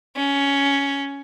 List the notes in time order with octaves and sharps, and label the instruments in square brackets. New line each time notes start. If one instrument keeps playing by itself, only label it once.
[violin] C#4